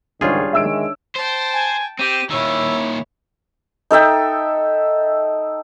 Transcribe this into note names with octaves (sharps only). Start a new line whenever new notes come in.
C#2 G#2 D#3 G3 D4 F4 G#4 C#5
D#3 G#3 E5 E6 D7
C5 G5 A5
G#5
C4 G4 D#7
A#2 D#3 E4 C#5 E6
D#4 A4 E5 G5